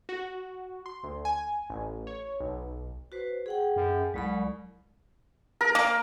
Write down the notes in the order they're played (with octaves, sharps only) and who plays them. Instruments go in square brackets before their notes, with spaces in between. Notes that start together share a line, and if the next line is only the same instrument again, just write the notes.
[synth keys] F#4
C6
D2
G#5
A1
C#5
B1
[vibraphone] F#4 B4 C5
G#4 F#5 G5
[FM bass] F#2
[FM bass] C2 [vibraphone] F#3 G#3 B5
[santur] A#4
[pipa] A#3